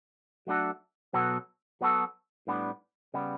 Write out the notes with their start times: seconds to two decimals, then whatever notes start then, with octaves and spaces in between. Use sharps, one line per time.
0.47 F#3 A3 D4 F#4 A4
1.13 B2 F#3 B3 F#4 A4
1.81 F#3 B3 F#4 A4
2.47 A2 G3 B3 D4
3.14 C#3 G3 B3